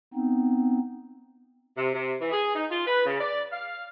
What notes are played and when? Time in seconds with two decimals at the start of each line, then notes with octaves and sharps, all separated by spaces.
0.14 B3 C4 D#4
1.77 C3
1.94 C3
2.20 E3
2.31 G#4
2.55 D#4
2.70 F4
2.86 B4
3.05 C#3
3.20 D5
3.52 F5